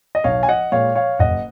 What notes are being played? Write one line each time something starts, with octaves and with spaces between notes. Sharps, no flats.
D#5
B1 C#5 F5
G#5
D#5 F#5
A#2 G#3 C#5 F5
C#5 F5
F#1 D#5 F#5